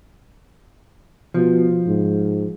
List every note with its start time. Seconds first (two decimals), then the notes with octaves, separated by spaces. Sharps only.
1.34 B2 F3
1.87 G#2